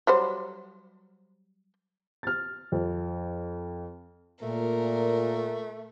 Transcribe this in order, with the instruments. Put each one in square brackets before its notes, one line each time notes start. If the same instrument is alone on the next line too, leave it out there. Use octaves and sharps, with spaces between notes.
[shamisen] F#3 G3 C5
[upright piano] F6 A6
F2
[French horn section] A#2 [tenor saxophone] A3 [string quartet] A#4